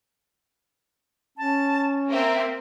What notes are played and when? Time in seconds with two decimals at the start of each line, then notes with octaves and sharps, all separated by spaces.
1.38 C#4 A5
2.11 A#3 C4 E5